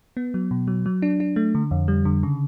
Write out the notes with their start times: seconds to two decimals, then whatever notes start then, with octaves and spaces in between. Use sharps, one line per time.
0.17 B3
0.34 F#3
0.51 B2
0.68 F#3
0.86 F#3
1.02 D4
1.20 D4
1.36 A3
1.55 D3
1.71 F2
1.88 G3
2.05 D3
2.23 C#3